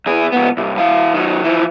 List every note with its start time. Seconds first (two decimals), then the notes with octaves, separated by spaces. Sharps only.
0.06 E2 G#4
0.32 C#2 B3
0.57 C2 G2
0.78 E3 F5
1.14 D#3 F#3
1.44 E3 F3